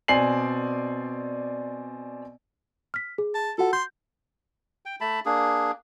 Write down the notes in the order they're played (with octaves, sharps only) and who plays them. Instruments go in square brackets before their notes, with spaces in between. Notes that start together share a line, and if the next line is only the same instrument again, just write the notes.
[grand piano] B2 C4 D5 G#5 C7 F#7
[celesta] F6 B6
G#4
[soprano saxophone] A5
[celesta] F4 F#4 F#5 [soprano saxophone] A4
[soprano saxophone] C6 [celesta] G6
[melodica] G5
A3 A5 B5
A#3 D4 G#4